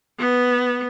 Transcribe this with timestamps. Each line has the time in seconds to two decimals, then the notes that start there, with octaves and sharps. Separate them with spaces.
0.19 B3